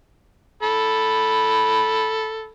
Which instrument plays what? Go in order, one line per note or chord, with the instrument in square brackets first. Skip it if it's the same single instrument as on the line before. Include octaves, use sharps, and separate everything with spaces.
[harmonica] A4 B5